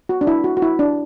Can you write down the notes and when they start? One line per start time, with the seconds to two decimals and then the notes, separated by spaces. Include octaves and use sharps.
0.09 F#4
0.21 D4
0.27 E4
0.44 F#4
0.57 F#4
0.62 E4
0.79 D4